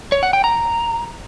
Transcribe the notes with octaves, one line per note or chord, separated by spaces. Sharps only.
C#5
F#5
G5
A#5